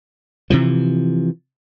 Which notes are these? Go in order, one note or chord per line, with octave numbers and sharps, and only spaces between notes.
C3 E3 F3